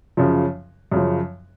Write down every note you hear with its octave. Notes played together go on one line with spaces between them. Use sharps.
F#2 C#3 F3
F#2 C#3 F3